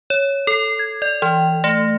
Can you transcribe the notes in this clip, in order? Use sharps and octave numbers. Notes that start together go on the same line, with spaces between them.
C#5
A4
G#6
D5
E3
A3